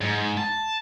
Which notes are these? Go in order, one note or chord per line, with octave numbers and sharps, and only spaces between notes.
G#2
A5